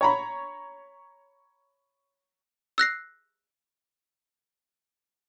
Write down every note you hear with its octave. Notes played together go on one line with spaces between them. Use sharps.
C#5 A#5 B5
E6 F#6 A#6 C7